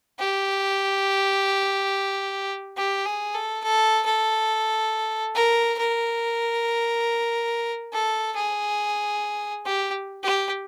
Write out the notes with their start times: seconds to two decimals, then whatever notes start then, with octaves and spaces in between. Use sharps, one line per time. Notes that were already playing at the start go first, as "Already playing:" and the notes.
0.19 G4
2.77 G4
3.06 G#4
3.34 A4
3.63 A4
4.06 A4
5.35 A#4
5.78 A#4
7.93 A4
8.36 G#4
9.66 G4
10.23 G4